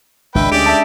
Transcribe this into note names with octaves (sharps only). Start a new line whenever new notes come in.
G#1 C#2 G#3 D4 B4 E5 G5
D2 C#4 D4 G4 G#4 D5 D7
E5 A5